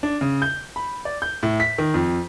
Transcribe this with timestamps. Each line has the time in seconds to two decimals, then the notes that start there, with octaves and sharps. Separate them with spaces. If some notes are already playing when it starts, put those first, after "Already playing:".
0.03 D4
0.21 C#3
0.42 G6
0.76 B5
1.05 D5
1.22 G6
1.43 A2
1.60 B6
1.78 D#3
1.94 F2